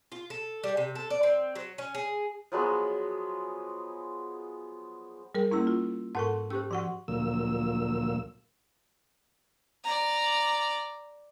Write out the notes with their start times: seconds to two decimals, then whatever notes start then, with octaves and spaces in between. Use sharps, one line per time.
0.12 F4
0.30 A4
0.64 G3
0.77 C3
0.95 A4
1.10 D5
1.23 C4
1.55 F#3
1.78 C#4
1.95 G#4
2.52 F3 F#3 G#3 B3
5.35 G3 G#4 A#4
5.51 A#3 C#4 E4 A#5 C6 E6
5.67 F4
6.15 G#2 A4 A#4 F#5 A5 C6 C#6
6.50 C#4 G4 C5 E6
6.71 F3 F#4 F#5 C6 C#6
7.08 D2 A#2 F3 F#3 A#3 E6
9.84 D5 A#5